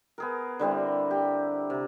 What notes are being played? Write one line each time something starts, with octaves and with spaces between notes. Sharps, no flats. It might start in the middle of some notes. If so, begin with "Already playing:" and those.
B3 G#4 A#4
D3 G3 C4 E4
G4
C3